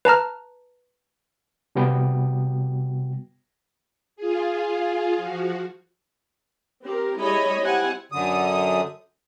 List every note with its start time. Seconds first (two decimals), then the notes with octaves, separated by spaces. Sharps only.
0.05 B4 A5 A#5 F6
1.75 C3 G3 B3 F#4 G5
4.16 F4 G#4
5.17 F3 F#4
6.85 C4 G4 A#4
7.20 G3 G#3 E4 C#5 D#5 B5
7.60 C4 E4 G4 F#5 G#5
8.12 F#2 D3 D#6